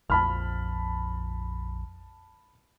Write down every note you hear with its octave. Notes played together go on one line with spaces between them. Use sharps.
A#1 F2 A5 B5 F6